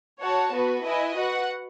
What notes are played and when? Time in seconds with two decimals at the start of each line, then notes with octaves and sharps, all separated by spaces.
0.21 F#4 C#5 F#5 A5
0.52 B3 F#4 B4
0.84 E4 B4 D#5 G#5
1.16 F#4 B4 F#5